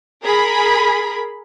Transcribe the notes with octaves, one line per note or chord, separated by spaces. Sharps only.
G#4 A#4 B5